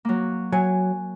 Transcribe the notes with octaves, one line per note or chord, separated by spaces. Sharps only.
F#3 A#3
F#3 G#5